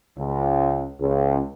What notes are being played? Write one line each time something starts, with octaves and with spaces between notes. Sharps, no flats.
C#2
C#2